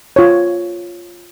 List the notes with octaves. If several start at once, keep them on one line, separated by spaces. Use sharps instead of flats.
F4 C#5